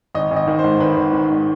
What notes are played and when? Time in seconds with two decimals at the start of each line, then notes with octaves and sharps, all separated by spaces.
0.15 G#1 D#5
0.31 G#1
0.36 D#5
0.47 D#3
0.59 C5
0.64 G#2
0.80 G#1 B4
0.97 G#1
1.13 D#3
1.30 G#2